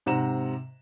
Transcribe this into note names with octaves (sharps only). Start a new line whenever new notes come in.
G#2 C3 F#5 A#5 E7